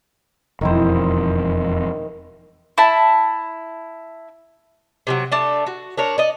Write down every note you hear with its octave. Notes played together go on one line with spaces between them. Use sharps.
E1 F2 D#3 E4 C5
E4 A5
C3 E3 F#3
A3 D4 A5
F#4
D4 A#4 C#5
D5 D#5